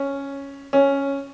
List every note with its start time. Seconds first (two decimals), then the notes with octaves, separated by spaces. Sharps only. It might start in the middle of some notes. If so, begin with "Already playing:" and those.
Already playing: C#4
0.73 C#4